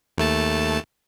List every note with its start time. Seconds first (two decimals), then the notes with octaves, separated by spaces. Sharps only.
0.18 D#2 A3 A5